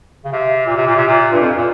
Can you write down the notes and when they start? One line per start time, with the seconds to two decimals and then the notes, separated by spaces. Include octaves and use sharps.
0.25 C#3
0.32 C3
0.66 A#2
0.77 C3
0.87 A#2
0.96 C3
1.08 A#2
1.32 G2
1.41 F2
1.57 A#2